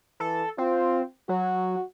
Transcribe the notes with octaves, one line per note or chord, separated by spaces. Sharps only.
E3 A4
C4 F4
F#3 F#4